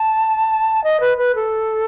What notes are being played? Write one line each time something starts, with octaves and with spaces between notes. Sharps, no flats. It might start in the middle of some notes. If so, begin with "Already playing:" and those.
Already playing: A5
D#5
B4
B4
A4